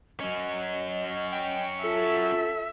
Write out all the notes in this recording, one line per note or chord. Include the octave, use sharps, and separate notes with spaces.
F#3 C#4 D#5
G5
F4 A4 E5